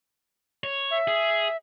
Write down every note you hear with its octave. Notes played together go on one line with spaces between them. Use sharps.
C#5
E5
G#4